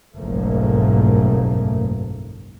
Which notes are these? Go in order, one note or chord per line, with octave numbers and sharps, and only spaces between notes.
F#1 B1 G#2 F3 A3 A#3